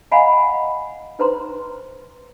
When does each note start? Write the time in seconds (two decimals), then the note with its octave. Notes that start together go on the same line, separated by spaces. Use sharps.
0.11 D#5 F5 F#5 G#5 A#5 B5
1.19 D#4 B4 C5 A#5 C6